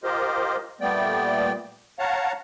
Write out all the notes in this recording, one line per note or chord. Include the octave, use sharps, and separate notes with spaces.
F4 G4 A#4 C5 D#5
A#2 G3 A3 B3 D5 G5
C#5 F5 F#5 A5 A#5